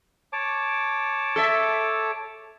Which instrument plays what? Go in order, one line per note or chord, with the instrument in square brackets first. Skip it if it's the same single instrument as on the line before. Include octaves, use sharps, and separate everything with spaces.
[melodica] C#5 A5 D6
[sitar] A4 E5